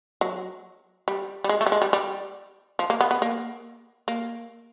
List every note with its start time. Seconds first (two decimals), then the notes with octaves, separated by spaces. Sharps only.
0.21 F#3
1.08 G3
1.44 G3
1.49 G#3
1.61 A3
1.67 G3
1.72 G#3
1.82 G3
1.93 G3
2.79 F3
2.90 A#3
3.01 B3
3.11 B3
3.22 A#3
4.08 A#3